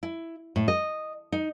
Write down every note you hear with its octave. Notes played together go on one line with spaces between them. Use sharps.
E4
A2
D#5
D#4